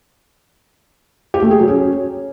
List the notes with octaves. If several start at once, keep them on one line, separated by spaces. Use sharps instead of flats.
G4
A3
G#4
F#3
C#4